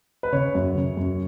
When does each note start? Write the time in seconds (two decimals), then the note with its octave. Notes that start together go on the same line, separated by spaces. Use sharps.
0.23 B4
0.32 C#3 C#5
0.55 F#2
0.75 C#3
0.97 F#2